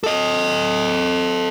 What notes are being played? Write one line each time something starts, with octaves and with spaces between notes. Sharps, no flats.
A4 D#5